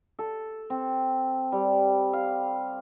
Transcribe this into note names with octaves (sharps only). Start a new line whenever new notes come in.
A4
C4
G3
F5